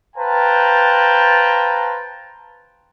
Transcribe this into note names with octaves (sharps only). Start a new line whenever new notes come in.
B4 C5 F5 G5 A5 A#5